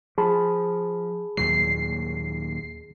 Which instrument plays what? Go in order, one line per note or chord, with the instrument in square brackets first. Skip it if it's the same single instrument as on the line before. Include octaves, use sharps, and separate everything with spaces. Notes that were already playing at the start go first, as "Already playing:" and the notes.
[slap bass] F3 [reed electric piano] G#4 A5 B5
[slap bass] D#2 A#2 F#3 [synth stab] C7